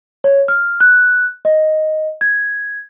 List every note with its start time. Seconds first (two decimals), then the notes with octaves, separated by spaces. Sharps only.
0.24 C#5
0.48 F6
0.80 F#6
1.45 D#5
2.21 G#6